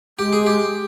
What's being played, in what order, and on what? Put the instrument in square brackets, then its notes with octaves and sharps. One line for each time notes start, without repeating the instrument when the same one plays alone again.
[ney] G#3 [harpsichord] G4
[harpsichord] G#4
G4